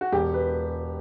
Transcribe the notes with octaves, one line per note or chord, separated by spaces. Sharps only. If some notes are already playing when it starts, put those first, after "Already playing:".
F#4
E1 G4
B4